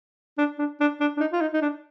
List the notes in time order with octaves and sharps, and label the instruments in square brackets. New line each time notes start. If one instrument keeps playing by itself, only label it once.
[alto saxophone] D4
D4
D4
D4
D4
D#4
F4
D#4
D#4
D4